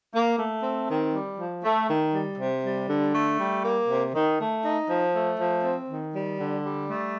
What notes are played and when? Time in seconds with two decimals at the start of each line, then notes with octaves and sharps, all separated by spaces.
0.12 A#3
0.37 A3
0.62 C4
0.88 D#3
1.12 G3
1.37 F3
1.62 A3
1.88 D#3
2.12 G3
2.37 C3
2.62 G3
2.87 D3
3.13 A3
3.37 G3
3.62 A#3
3.87 C3
4.13 D#3
4.38 A3
4.63 D#4
4.88 F3
5.12 A3
5.37 F3
5.62 C4
5.88 D#3
6.13 G3
6.38 D3
6.63 G3
6.88 A3